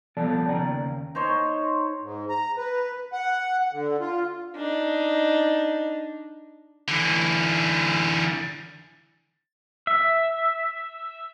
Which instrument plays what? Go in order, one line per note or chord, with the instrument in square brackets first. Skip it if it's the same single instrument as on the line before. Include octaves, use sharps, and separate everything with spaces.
[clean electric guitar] C2 F3 B3 A4 D5 A5
D#2 C#3 D5 G5 A#5
[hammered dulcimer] D#4 C5 C#5
[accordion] G#2
A#5
B4
F#5
D3
F4
[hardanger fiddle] D4 D#4
[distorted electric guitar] D3 E3
[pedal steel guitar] E5